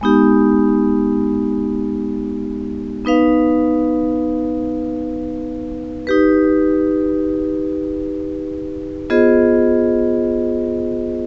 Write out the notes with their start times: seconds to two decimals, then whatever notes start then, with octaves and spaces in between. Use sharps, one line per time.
0.01 G#3 B3 D#4 G4
3.05 B3 D#4 B4 F5
6.07 D#4 G4 B4
9.10 B3 F4 G#4 C5 D#5